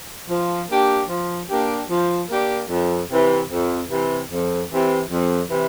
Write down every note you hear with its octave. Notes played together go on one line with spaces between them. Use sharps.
F3
A#3 D4 G4
F3
A#3 D4 G4
F3
A#3 D4 G4
F2
C3 E3
F2
C3 E3
F2
C3 E3
F2
C3 E3